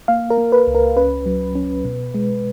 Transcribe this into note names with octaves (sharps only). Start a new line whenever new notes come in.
A#3 F5
A#4
A#3
B4
C#2
A#4
C#4 B4
F#3
C#4
B2
G#3